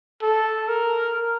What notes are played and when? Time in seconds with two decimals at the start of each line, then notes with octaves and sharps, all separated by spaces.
0.22 A4
0.69 A#4